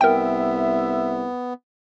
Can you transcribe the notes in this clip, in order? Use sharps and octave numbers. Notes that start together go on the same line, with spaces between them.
C2 B3 A#4 E5 G5